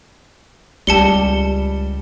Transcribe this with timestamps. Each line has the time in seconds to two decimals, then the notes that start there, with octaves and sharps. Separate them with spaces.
0.87 C#2 G3 G4 A5 C#7 G7